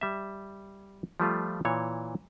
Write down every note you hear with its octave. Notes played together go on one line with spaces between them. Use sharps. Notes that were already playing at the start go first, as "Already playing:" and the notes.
G3 E5
F3 G3 A3 F4
A#2 E3 C#5